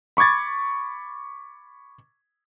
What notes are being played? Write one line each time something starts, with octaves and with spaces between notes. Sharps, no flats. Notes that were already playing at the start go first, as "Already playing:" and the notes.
B5 C#6 D6 G#6 A6